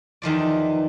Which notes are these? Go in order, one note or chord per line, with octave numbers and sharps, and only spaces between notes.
E2 D#3 F3 D5